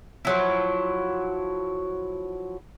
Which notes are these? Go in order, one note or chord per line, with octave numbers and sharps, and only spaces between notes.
F3 F#3 E4